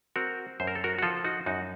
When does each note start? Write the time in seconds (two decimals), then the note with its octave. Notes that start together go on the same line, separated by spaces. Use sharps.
0.16 C4 F#4 A#4
0.60 F#2 C5
0.67 A#4
0.75 A4
0.84 F#4 A#4
0.99 F#4
1.02 F3 F4 A4
1.17 A4
1.24 D#4 F#4
1.46 F#2 D#4 F#4